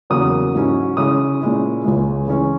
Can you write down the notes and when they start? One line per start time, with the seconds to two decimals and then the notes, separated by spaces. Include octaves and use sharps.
0.10 E2 C#3 F#3 A#3 D#6
0.54 G#2 F#3 C#4 E4
0.97 C#3 G#3 C#4 E4 D#6
1.41 A#2 G#3 C#4 E4
1.84 C#2 C#3 G#3
2.28 C#3 E3 G#3 C#4